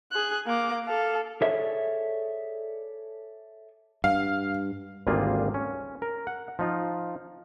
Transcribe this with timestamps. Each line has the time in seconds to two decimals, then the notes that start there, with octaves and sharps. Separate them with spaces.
0.12 G#4 F#6
0.46 A#3 D6
0.86 A4 F5
1.41 G#4 A4 C#5 D5 E5
4.04 G2 F5
5.07 G#1 D2 G3 A#3 F4 G#4
5.54 C#4
6.02 A#4
6.27 F#5
6.59 F3 D#4 F4